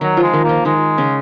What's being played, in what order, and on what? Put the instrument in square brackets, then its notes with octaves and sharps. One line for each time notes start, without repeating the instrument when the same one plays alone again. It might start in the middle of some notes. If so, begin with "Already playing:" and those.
[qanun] D#3 D#4 [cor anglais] F#3
[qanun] F3 F4
[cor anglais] G#3
[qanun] D#3 D#4
[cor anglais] A#3
[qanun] F3 F4
[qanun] D#3 D#4 [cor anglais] G#3
[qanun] C#3 C#4